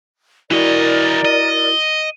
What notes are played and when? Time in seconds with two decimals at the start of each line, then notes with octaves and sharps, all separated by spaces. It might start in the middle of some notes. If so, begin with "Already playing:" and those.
0.51 E3 E4 F#4 A#4 D5 D#5
1.25 D#5